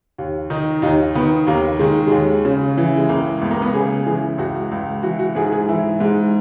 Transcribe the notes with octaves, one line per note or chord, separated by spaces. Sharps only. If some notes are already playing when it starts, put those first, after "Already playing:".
D#2
D#3 D#4
D#2 D#4
D#3 B3
D#2 A#3
D#3 G#3
D#2 G#3
C#3
E3
G#3
C#2 A#3
C#2 B3
A#3
B3
C#3 G#4
E3 G#4
C#2 F#4
C#2
E3 F#4
F#4
G#2 G#4
G#4
E3 E4
G#2 G#3